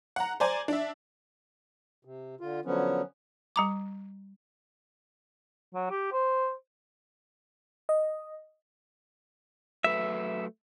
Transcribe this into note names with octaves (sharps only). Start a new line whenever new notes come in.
F#5 A#5
C5 D5 G#5 A#5
D4 E5
C3
D3 F4
D3 F3 F#3 B3 C#4
G3 A#5 D6
F#3
G4
C5
D#5
F#3 A3 B4 E5